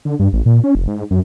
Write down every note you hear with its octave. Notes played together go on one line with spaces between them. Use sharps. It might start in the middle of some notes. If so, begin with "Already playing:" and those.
D3
G2
A1
A#2
C#4
F1
G#2
F#2